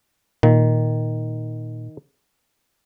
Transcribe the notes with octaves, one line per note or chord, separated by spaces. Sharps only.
A#2 D#3